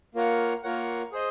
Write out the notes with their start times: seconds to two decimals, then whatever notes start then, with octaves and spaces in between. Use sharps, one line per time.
0.15 A#3 F4 A#4 C#5 F#5
0.63 A#3 F4 A#4 C#5 F#5
1.12 G#4 C5 D#5